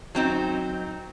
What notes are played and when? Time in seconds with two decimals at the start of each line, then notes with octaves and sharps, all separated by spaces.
0.15 F#3 C4 D#4